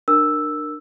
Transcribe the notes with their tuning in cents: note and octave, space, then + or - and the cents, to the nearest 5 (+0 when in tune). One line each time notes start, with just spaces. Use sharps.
D4 +30 A#4 +0 E6 +0